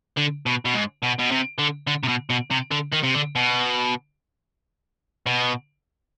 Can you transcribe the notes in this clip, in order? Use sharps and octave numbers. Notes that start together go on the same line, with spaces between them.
D3
B2
B2
G#2
B2
B2
C3
D3
D3
C3
B2
B2
C3
D3
D#3
C3
D3
B2
B2